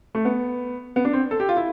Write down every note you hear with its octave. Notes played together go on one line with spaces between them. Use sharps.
A3
B3
B3
D4
C4
A4
G4
F4
E4